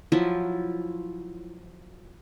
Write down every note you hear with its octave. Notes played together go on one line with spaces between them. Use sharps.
F3 F#3 E4 F4